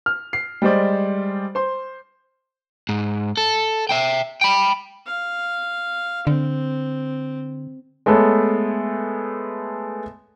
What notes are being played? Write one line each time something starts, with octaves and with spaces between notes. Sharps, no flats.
F6
C7
G3 G#3 C5 D5
C5 C6
G#2
A4
E5 G5
G5 B5
F5
D3 C4
G#3 A3 B3 A4 C#5